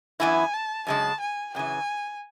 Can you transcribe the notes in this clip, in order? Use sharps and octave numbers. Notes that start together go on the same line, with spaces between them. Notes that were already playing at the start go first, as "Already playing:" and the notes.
F#2 E3 B3 E4 G#5
A5
F#2 C#3 G#3 A5
G#5
F#2 C#3 E3 G#5